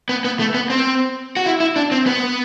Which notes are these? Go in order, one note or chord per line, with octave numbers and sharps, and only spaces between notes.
B3
B3
A3
B3
C4
F#4
E4
E4
D4
C4
B3